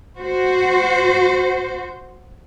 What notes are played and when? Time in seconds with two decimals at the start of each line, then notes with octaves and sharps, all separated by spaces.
0.18 F#4 C5